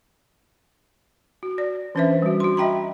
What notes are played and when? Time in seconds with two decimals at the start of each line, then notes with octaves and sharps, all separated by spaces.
1.43 F#4
1.58 D5
1.95 E3 C#4 D4 B4 C5 E5
2.22 G3 F#4
2.40 F#4 C6
2.57 D#5 E5 G5 A#5 B5